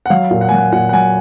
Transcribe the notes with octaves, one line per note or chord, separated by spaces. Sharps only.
F#5
F#3 F5
A#2
F#5
G#5
F#3 F#5
A#2 F#5
F#5
F#3 G#5